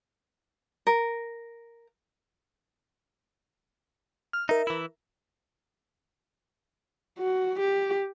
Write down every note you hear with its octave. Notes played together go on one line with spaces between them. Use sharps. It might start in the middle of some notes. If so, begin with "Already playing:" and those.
A#4
F6
D#4 A#4 E5
E3 E4
F#4
G4